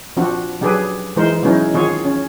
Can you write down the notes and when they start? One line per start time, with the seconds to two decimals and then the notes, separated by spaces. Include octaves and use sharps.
0.17 F3 C4 D4 F#4
0.61 F#3 D4 G4 G#4 B4
1.16 E3 G#3 D#4 A#4 C5
1.43 F#3 G#3 B3 C#4 D#4 E4
1.74 D#3 C4 F4 G#4 C#5
2.05 C#4